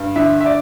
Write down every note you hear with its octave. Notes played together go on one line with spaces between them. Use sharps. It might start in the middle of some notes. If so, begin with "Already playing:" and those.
Already playing: G2
D3 E5
E5
D5